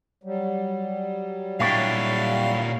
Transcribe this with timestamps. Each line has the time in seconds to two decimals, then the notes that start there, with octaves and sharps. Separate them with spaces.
0.24 F#3 G3
1.60 A#2 D4 E4 C#5 F5 G5